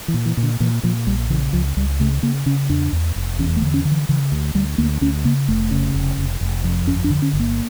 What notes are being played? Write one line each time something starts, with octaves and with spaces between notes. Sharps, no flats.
E3
A#2
E3
A#2
D3
A#2 E3
A#2 F3
A#1 G3
C#3 E3
C#2 F3
C#2 G3
C#3 A3
C#3 A#3
C#3 C#4
E2 D4
E2
F1
E2 C#4
A3
D3
C#4
D3
E3
C#3 E3
D2
D2 G3
D2 A#3
D2 C#4
C#3 A#3
F1 A3
C#3
F1
F1
F1
F2
G1 C#4
D4
D3
C#4
G1
A#3